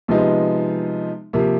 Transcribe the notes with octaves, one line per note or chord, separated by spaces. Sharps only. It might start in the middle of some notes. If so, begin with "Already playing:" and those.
C3 F3 G#3 B3 D#4
C3 F3 A#3